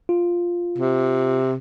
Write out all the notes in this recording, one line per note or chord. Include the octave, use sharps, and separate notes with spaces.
F4
C3